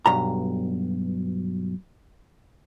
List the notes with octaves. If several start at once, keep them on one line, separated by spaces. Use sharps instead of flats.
B1 G2 A#5